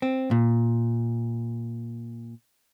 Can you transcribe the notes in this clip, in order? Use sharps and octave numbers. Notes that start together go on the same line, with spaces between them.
C4
A#2